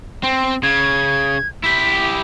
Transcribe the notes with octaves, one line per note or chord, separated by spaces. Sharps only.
C4
C#3 G#6
E4 G4 B6